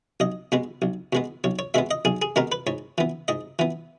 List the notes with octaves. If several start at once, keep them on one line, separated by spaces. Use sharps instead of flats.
B1 D#5
B2 G#3 B3
B1
B2 G#3 B3
B1 C#5
C#5
B2 G#3 B3 E5
D#5
B1 G#4
G#4
B2 G#3 B3 A#4
B4
G#2 C#5
E3 B3
G#2 D#5
E3 B3